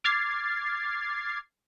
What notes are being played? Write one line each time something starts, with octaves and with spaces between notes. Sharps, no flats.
D6 F6 G#6 A6 C7